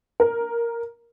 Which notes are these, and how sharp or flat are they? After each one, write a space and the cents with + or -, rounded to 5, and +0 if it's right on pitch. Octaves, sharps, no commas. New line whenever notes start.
A#4 +0